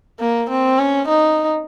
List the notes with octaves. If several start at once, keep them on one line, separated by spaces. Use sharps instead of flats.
A#3
C4
C#4
D#4